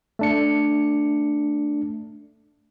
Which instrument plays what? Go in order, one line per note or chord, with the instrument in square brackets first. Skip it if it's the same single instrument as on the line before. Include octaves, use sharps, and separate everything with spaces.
[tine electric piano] A3 D4 C#7